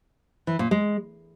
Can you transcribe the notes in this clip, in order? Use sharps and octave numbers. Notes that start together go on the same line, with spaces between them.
E3
A#2
G#3